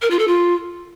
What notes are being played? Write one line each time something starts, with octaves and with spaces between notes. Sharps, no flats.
A#4
F4
A4
F4